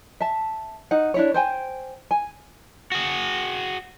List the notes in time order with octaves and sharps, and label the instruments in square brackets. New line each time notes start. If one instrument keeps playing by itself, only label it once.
[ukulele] E5 A5
D#4 F#5
D4 E4 C#5
C5 G5 G#5
G#5
[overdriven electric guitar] F#4 G#4